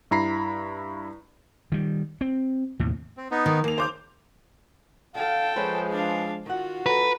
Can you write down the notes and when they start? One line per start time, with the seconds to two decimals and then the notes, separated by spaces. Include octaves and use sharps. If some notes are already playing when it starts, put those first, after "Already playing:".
0.11 G2 E4 A#5 B5 C7
1.72 D#3 G3
2.21 C4
2.80 D#2 A2 C3
3.17 C4
3.31 B3 D#4
3.46 D#3
3.64 D#2 A#3 F7
3.78 C#3 C5 D6 G6
5.15 D3 A4 F5 G5
5.56 F3 G#3 C#4 B4 C5
5.91 D4 F5
6.46 D#3 F4 F#4 F#5
6.86 D2 F#3 A4 B4 A#5